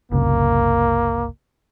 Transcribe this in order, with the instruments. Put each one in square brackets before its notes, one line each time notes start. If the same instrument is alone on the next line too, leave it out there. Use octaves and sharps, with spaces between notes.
[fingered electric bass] F#1 C2 C#3 [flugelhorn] A#3